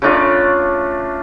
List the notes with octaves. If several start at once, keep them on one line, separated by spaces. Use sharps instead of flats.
C#3 A3 D4 F4